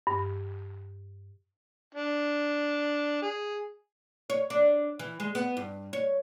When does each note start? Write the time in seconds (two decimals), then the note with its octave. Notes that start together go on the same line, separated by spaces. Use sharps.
0.07 G2
1.95 D4
3.22 G#4
4.30 C#5
4.50 D4
4.99 E3
5.20 G#3
5.35 B3
5.57 G2
5.93 C#5